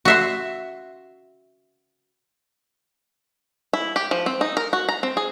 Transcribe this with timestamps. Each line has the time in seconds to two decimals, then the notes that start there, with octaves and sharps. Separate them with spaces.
0.05 F#4 E5 C6
3.73 E4
3.96 G4
4.11 F3
4.26 C4
4.41 D#4
4.57 A#4
4.73 F#4
4.89 A#5
5.03 C4
5.17 G#4